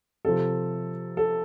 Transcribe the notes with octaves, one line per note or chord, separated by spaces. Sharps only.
C3 F3 A4
A4